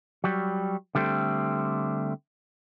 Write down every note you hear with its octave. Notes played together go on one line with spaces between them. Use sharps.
F#3 G3
D3 G3 A3 C4